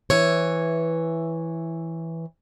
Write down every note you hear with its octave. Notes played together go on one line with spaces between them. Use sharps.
E3 C#5